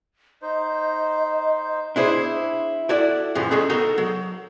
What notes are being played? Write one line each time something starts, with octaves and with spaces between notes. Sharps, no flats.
D#4 C5 D#5
D4 E4 G#4 C5
E4 F#4 A4 D5
F#2 A#2 E3 F3
G#3 A3 C#4 D#4 G#4 A4
B3 D#4 F#4 A4 A#4
F#3